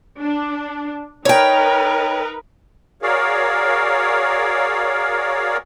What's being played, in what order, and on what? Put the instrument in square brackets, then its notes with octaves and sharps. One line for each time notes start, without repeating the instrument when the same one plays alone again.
[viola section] D4
[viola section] D#4 A#4 B4 [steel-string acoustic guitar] C#5 G5
[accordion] F#4 G#4 A#4 C#5 D5 F5